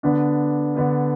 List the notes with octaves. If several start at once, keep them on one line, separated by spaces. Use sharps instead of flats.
D3 B3 D4
D3 B3 D4